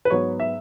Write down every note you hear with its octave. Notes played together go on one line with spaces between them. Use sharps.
B4
G#2 F#3 B3 C#5
E5